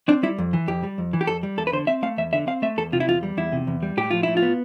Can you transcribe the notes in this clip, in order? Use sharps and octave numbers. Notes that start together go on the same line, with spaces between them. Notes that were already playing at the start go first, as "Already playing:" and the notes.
C4 D4
G3 E4
F2
E3
F2 G4
G3
F2
E3
G4
F2 A4
G3
E2 A4
B4
D3 C5
C4 E5
A3 F5
E2 E5
D3 E5
C4 F5
A3 E5
E2 A4
C3 F4
E4
E2 F4
G3
E2 E4
C3
E2
G3
A2 G4
F3 F4
A2 E4
F4
B3